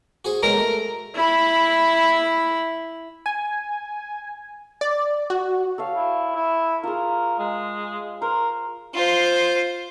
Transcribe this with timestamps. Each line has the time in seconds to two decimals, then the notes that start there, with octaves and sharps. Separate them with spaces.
0.25 F#4 G#4 C5
0.43 B2 F#3 G#3 A#4
0.57 A3
1.15 E4 B5
3.26 G#5
4.81 D5
5.30 F#4
5.78 A4 C#5 F5
5.95 E4
6.35 E4
6.83 F4 G#4 A#4
7.39 G#3
8.22 A#4 C5
8.94 F4 C5